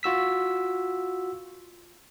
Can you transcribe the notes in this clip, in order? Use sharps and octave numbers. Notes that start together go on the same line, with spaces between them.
F4 F#4 E6 B6